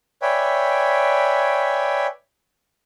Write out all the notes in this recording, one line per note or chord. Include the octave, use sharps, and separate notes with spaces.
B4 C#5 D5 E5 G5 G#5